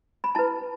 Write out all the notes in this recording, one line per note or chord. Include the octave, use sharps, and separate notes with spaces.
B5
E4 B4 A5